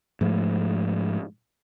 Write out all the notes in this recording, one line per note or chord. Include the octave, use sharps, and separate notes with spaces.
G#2 F3 A3